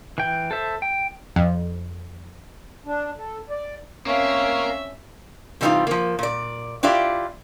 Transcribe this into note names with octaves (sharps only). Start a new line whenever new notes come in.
E3 G5
A4 C5 E5
G5
F2
D4
A4
D5
A#3 C4 C#4 E5 F5
C3 E3 G3 G#3 D#4 F4
F3 A#3
A#2 D5
D4 E4 F4 G4 D5